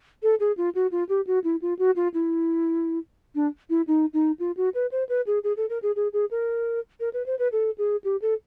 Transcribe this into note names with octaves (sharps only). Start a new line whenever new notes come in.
A4
G#4
F4
F#4
F4
G4
F#4
E4
F4
F#4
F4
E4
D4
E4
D#4
D#4
F4
F#4
B4
C5
B4
G#4
G#4
A4
A#4
G#4
G#4
G#4
A#4
A#4
B4
C5
B4
A4
G#4
G4
A4